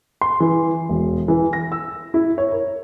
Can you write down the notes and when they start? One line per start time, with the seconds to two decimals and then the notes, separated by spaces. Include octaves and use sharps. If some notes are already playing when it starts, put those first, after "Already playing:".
0.21 C6
0.40 E3
0.89 E1
1.28 E3
1.53 A#6
1.72 E6
2.14 E4
2.38 C#5
2.52 A#4